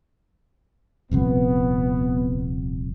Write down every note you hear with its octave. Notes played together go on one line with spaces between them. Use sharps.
D#1 C2 F2 B3